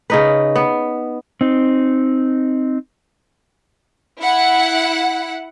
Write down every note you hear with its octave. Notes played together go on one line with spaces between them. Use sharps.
C#3 D#4 B4
B3
C4 D#4
E4 F#5